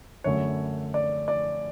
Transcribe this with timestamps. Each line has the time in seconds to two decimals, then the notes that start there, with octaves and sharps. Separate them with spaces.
0.24 F#2 D3 A3 C#5
0.94 D5
1.28 D5